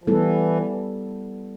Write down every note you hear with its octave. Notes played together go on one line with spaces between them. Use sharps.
F3
E3 G3 B3 E4 A4